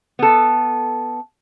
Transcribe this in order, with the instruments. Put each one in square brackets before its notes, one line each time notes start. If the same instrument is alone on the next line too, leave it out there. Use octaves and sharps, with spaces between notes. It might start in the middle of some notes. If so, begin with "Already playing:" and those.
[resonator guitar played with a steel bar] B3 A4